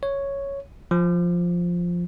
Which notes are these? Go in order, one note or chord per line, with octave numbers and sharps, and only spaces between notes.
C#5
F3